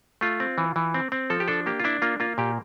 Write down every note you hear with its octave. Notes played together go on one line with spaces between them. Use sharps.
A3 F4
C4
E3
E3
C4
C4
F3 A4
G4
D4 A4
A#3 G4
F4
D4 E4
A#3 F4
A#3 F4
A#2 G4